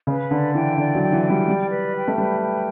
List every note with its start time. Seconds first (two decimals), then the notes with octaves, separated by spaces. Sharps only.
0.07 C#3 B4
0.31 D3 D5
0.54 E3 G5
0.78 D3 D5
0.95 F#3
1.01 G5
1.12 E3
1.24 G5
1.30 G3
1.47 G3 D5
1.71 B4
1.95 G5
2.08 A3
2.18 G3 B4
2.41 G5